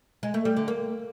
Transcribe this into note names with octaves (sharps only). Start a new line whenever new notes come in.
G#3
A3
G3
D3
A#3